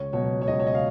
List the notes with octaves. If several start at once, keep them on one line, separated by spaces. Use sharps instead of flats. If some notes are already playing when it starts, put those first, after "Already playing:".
Already playing: C#2 C#5
B2 F#3 C#5
C#5
C#2 D#5
C#5
D#5
F5